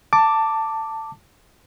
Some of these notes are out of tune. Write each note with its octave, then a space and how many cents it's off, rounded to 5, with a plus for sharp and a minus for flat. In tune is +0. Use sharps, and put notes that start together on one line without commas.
A5 +15 D6 +0